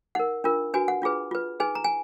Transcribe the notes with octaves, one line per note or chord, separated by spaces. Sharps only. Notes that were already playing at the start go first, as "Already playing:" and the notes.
D#4 A#4 F#5
D4 F4 A#4
D4 F#4 B4 G#5
F#5
D4 F4 G#4 B4
F4 B4
D#4 G#4 B4 G#5
A#5
G#5